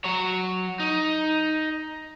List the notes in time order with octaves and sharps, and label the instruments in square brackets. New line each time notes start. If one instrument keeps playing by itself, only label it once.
[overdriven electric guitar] F#3 C#5
D#4